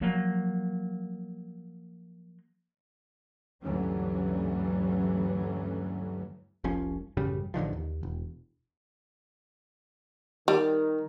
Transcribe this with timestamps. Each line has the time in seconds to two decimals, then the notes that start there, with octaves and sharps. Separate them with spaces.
0.01 F3 F#3 A#3
3.62 D2 G2 E3 F#3 A3 C#4
6.64 F1 C2 F3 C#4
7.17 A1 F#2 C#3 G3
7.54 A1 D3 D#3 F3
7.73 D#2
8.03 E1
10.48 D#3 G3